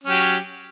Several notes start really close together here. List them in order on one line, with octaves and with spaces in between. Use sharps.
C#4 F#3 G4